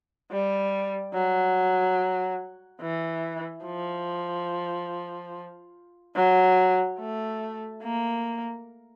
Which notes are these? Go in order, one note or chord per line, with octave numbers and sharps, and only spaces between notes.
G3
F#3
E3
F3
F#3
A3
A#3